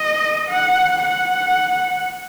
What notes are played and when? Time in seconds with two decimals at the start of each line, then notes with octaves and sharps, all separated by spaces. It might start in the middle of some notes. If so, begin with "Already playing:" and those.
Already playing: D#5
0.49 F#5
1.03 F#5